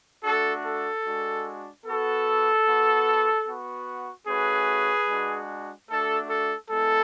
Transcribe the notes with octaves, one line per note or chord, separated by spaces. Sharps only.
A3 D4 F#4 A4
A4
G#3 D4 F#4
B3 F#4 A4
B3 F#4
B3 F#4
A3 C#4 F#4 G#4 B4
G#3 D4 F#4
A3 D4 F#4 A4
A4
G#3 B3 E4 A4